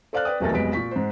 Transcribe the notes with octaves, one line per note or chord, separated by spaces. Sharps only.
A4 C5 D5 F5 F6 F#6
B4 D5 G5 D#6
D#1 B1 E2 A3 A#4 A6
F1 B1 G#3 B3 B6 D7
A#2 C#6 B6
G#2 C5